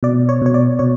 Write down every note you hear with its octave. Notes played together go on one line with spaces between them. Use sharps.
B2 D5
C#5
B2 C#5
D5
B2 C#5